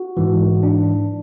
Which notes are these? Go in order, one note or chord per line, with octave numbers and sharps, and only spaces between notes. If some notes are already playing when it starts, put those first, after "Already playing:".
Already playing: F#4
G#2 E3
D4